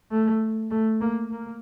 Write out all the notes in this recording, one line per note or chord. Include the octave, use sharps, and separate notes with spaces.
A3
A3
A#3
A#3